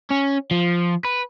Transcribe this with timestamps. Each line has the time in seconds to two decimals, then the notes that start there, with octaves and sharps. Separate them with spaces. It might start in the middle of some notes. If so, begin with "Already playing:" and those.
0.10 C#4
0.51 F3
1.05 B4